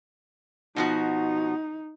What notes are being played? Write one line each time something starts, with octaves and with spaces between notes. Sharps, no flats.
B2 F3 D#4 F#4